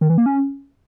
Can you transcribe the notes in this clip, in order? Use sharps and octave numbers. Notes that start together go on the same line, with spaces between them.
D#3
E3
A#3
C#4